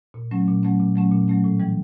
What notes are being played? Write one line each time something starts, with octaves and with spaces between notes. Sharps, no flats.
A#2
F#3 A3 C#4
A#2
F#3 A3 C#4
A#2
F#3 A3 C#4
A#2
F#3 A3 C#4
A2
E3 G3